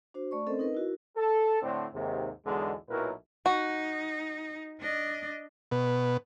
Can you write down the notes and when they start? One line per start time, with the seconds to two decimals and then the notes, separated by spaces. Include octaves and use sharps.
0.14 D4 F#4 C5
0.31 A3 D5 C#6
0.47 C4 C#4 A4 A#4 C5 D#5
0.59 D#4 A#4 B4 D#5
0.74 E4 F#4 A#4
1.17 A4
1.62 A2 D3 C4
1.93 D#2 G#2 C3
2.46 B1 E2 D3 G#3
2.90 B1 A#2 F#3 E4 A#4 B4
3.46 D#4 F#4
4.80 D4 D#5
5.71 B2